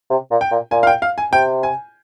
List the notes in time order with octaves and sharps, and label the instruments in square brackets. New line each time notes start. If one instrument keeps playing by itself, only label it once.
[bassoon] C3
A#2
[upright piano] G5
[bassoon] A#2
[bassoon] A#2 [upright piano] G#5
[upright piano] F5
G5
F5
G#5
[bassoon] C3 [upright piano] G5
[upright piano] G#5